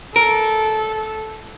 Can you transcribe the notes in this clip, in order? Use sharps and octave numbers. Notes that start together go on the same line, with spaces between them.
A4 A#4